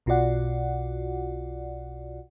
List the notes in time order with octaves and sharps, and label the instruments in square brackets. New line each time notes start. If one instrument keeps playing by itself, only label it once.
[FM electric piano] B1 B2 F4 F#4 D5 F#5